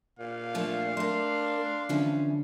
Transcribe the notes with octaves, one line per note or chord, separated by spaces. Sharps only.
A#2 F5
F3 A3 D4
A3 A#3 D4 C6
D3 E3 F3 C#4